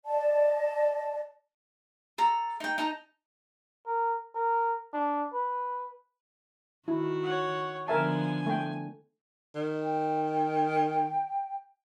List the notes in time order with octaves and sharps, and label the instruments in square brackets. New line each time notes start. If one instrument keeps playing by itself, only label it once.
[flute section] D5 D#5 A5
[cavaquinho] A4 A#5
D#4 G5
D#4 A5 A#5
[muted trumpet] A#4
A#4
D4
B4
[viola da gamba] D#3 F#4 [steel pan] E4
[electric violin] C#5 F#5
[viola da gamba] D3 F3 B3 [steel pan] A#4 E5 A5 [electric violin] G#5
[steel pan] A3 G5
[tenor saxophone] D#3
[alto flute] G5